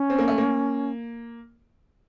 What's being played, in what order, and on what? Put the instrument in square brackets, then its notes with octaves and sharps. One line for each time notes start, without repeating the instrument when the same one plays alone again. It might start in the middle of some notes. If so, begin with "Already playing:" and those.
Already playing: [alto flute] C#4
[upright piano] C4
A#3
A3
A#3